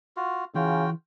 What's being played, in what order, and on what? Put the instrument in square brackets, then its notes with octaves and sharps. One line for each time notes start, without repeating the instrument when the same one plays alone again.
[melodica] F4 F#4
[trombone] C#3 [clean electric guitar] E3 [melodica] F4 F#4 G5